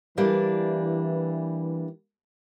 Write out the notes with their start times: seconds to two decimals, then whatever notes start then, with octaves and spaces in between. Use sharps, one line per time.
0.17 E3 G3 A#3 D4